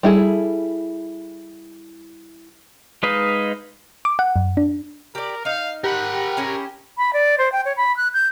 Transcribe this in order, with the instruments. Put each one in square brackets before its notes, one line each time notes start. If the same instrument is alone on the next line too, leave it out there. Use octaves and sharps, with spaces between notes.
[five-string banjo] G3 E4 G#4 A4
[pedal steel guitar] G#3 D#4 B4 D#5 F5
[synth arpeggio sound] D6
F#5
F#2
D4
[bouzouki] G4 D5 [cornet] A#4
[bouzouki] D#4 [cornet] F5
[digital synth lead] G4 [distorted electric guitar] A#4 B5 [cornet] F#5
[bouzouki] C#4 E4 G#4
[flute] B5
D5
C5
G5
C#5
B5
F#6
G6